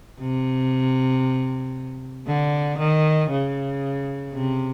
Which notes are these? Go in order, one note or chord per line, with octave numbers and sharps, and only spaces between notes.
C3
D3
D#3
C#3
C3